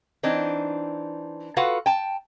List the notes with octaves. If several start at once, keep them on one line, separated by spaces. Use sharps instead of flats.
E3 C4 D4 D#4
F4 F#4 A4 B4 F5 F#5
G5 A5